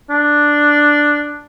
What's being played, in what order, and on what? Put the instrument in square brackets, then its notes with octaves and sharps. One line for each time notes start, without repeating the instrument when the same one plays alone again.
[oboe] D4